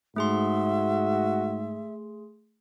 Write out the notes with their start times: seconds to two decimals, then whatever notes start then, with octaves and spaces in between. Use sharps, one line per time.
0.16 G#2 A3 F#4 G#4 E5 C6